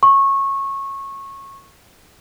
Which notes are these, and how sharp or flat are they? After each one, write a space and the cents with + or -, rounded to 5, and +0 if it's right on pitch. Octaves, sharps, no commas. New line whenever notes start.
C#6 -20